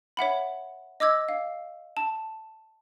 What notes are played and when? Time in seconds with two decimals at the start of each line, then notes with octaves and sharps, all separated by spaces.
0.17 C#5 E5 F#5 B5
1.00 D#5 D6 E6 G#6
1.29 F5
1.97 A5